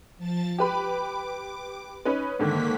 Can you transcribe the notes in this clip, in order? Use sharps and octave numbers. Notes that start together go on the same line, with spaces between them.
F3 A5 A6
G4 B4 B5 D6
C#4 D#4 B4
G#2 D3 D#3 A#3 B6